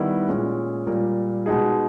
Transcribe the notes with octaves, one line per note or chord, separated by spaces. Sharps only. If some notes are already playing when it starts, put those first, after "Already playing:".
Already playing: D#3 G3 B3 E4
A#2 G#3 C#4
A#2 G3 A#3
B2 G#3 D#4 G#4